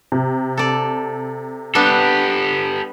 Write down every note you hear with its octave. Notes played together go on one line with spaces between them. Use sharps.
C3
A4 D5
G3 B3 D4 G4 A4